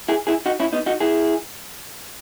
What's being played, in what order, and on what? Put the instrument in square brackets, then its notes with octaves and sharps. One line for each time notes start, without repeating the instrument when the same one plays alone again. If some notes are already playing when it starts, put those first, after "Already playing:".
[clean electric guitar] E4 G#4
E4 G#4
D#4 F#4
C#4 E4
B3 D#4
D#4 F#4
E4 G#4